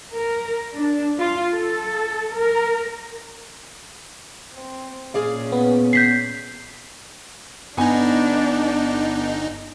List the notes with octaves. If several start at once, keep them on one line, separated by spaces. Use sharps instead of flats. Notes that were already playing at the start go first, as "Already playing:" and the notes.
A#4
D4
F4
A4
A#4
C4
A#2 C#4 G#4 D5 F5
B3
G6 B6 C7
G1 B3 D4 D#4 G#5